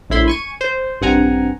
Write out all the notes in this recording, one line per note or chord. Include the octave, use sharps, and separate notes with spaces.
A#1 A2 E4 B5 C6
G#5 C#6 D#7
C5
A#1 G2 C4 F#5 G#5 A#5